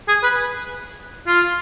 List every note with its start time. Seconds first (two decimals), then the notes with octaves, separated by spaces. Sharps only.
0.08 G#4
0.23 B4
1.27 F4